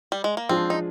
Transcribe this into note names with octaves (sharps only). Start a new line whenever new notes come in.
G3
G#3
A#3
F3 G#3 C4 D4 F4 G#4
D#4